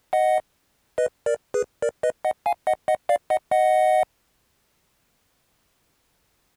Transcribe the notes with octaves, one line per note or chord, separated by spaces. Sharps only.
D#5 F#5
B4 D#5
A#4 D5
G#4 B4
A#4 D5
B4 D#5
D#5 F#5
F5 G#5
D#5 F#5
D#5 F#5
D5 F5
D#5 F#5
D#5 F#5